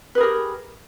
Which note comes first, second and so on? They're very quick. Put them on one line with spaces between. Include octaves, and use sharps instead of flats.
B4 G#4 A#4 G4